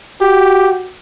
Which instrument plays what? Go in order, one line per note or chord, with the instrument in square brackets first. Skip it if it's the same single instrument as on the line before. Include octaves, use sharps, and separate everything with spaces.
[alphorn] F#4 [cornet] G4